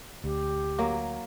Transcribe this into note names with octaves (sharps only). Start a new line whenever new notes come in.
D2 G4
F#3 A#3